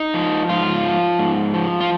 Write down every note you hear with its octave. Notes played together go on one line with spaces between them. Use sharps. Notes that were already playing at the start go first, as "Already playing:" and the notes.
Already playing: D#4
F3
G#2 F4
F3
G#2
F3
F4